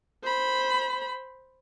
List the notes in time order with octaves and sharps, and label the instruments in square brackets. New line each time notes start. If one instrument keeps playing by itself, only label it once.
[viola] C5 B5